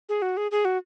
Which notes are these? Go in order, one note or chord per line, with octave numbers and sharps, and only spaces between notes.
G#4
F#4
G#4
G#4
F#4